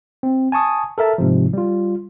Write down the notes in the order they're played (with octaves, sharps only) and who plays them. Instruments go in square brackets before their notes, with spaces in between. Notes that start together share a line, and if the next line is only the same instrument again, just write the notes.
[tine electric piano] C4
G#5 A5 C#6 D#6
A4 A#4 E5 A5
G#2 C3 F3
G3 F4